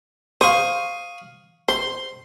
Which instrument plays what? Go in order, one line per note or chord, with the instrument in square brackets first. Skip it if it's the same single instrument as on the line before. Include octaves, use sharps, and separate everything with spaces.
[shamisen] C5 [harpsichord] F5 C#6 D#6
[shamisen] C5 [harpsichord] C6